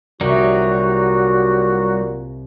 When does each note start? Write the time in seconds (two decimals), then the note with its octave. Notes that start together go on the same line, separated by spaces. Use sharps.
0.21 C2 A#2 F#3 G3 D#4 F#4 E5